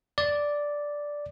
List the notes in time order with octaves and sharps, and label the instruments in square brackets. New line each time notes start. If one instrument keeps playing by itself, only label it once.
[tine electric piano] D5